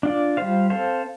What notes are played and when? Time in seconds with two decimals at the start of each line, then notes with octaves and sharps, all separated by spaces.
0.03 D4 F4 D5
0.37 G3 F4 C5 F5
0.70 C4 A4 C5 F5